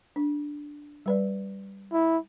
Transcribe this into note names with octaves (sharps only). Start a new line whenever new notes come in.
D4
G3 B4 D5
E4